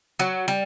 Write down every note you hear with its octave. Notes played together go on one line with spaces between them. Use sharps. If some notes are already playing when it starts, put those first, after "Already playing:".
F#3
G3